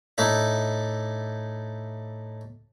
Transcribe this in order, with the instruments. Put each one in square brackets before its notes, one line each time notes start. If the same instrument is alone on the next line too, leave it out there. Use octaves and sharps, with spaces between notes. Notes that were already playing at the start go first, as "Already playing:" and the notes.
[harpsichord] A2 D4 D#4 E5